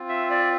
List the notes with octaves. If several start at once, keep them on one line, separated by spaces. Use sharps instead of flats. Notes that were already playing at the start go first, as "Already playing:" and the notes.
Already playing: C4 F4
E5
D5